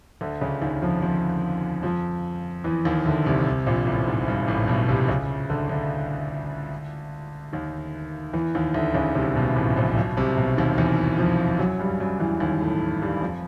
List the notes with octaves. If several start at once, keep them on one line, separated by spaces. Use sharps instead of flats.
D2 D3
C#2 C#3
D#2 D#3
F2 F3
F2 F3
F2 F3
E2 E3
D#2 D#3
D2 D3
C2 C3
C2 C3
A#1 A#2
A1 A2
G#2
G2
A1 A2
B1 B2
C2 C3
C#2 C#3
D2 D3
D2 D3
D#2 D#3
E2 E3
D#2 D#3
D2 D3
C#2 C#3
C2 C3
B1 B2
A1 A2
A#1 A#2
B1 B2
C2 C3
B1 B2
D#2 D#3
E2 E3
F2 F3
F#2 F#3
G2 G3
F#2 F#3
E2 E3
D#2 D#3
A2 A3
G2 G3
F2 F3